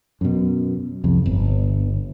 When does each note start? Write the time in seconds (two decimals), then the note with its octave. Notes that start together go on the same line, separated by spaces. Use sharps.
0.21 F#2 B2
1.04 C2 F2
1.26 G1